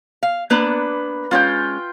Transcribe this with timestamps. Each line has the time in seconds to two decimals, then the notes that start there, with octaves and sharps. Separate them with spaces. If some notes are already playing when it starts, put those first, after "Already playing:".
0.23 F5
0.50 A#3 B3 D4 B4
1.31 G#3 C#4 F4 G5